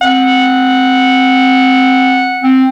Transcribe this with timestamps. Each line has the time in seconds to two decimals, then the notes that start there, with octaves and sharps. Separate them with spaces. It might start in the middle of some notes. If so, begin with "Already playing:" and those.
0.01 C4 F#5
2.44 C4